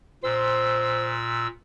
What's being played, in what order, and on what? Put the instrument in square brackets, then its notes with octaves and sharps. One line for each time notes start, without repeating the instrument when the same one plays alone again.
[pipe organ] A#2 E6 [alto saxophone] C5